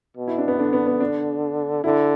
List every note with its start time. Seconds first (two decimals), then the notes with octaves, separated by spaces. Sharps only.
0.17 B2
0.28 E4
0.38 D4
0.48 B3
0.58 D3 D4
0.73 B3
0.87 B3
1.00 D4
1.84 D3 E4